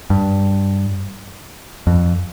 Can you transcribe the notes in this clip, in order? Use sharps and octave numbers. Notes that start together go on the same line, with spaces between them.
G2
F2